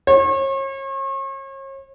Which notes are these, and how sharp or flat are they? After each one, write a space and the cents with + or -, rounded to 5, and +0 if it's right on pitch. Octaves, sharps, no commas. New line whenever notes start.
C#5 -40